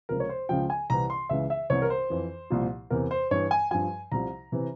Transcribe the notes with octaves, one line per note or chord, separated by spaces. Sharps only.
C#2 C3 F3 A#4
C#5
C5
C#2 C#3 F3 G5
G#5
C2 C3 E3 A#5
C6
C#2 C#3 E3 E5
E5
C2 C3 E3 C#5
A#4
C5
F2 E3
C2 A#2 F3
E2 C3 E3 A#4
C5
G2 E3 C#5
G#5
G2 F3 G#5
C2 C3 F3 A#5
C3 E3